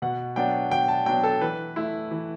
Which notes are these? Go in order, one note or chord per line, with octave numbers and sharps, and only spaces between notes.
B2 F#5
F#3 B3 D4 G5
B2 G5
A5
F#3 B3 D4 G5
A4
E3 B4
A3 E4
E3